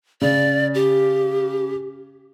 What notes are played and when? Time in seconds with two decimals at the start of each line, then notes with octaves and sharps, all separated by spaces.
0.21 C#3 D5
0.74 G4